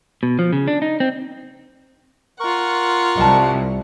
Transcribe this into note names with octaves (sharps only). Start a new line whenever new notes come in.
B2
F3
C#3
D4
D#4
C4
F4 A#4 F#5 C#6
C2 D#5 G5 A5